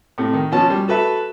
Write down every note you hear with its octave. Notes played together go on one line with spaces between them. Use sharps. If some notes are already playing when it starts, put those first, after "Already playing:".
A2 C3
D#3
B2 F3 C#4 A5
G3
F#4 A4 B4 E5